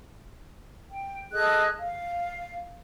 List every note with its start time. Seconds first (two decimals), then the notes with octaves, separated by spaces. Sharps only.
0.88 G5
1.32 G#4 A4 D#5 F#6
1.79 F5